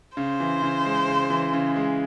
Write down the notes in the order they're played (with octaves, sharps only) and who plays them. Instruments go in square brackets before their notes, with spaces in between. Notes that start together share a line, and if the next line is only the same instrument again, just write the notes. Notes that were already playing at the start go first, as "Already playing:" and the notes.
[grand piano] C#3 [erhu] C5
[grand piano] E3
C#3
G#3
C#3
E3
C#3
G#3